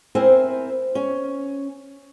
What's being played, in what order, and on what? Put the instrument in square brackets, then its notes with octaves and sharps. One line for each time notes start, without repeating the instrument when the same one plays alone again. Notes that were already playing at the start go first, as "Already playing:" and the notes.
[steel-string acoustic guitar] C4 E4 A#4 C5 G#5
C#4